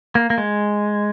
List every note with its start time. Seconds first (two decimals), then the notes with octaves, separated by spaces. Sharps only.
0.15 A#3
0.30 A#3
0.38 G#3